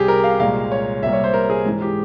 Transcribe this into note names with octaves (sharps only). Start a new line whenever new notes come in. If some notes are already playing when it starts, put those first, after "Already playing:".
Already playing: C2 C3 G3 G4 G#4
A#4
F5
C2 A#2 G#3 F5
C#5
C2 C3 G3 A#3 E5
C#5
C5
A#4
G#4
G#2 E3 G#3
G4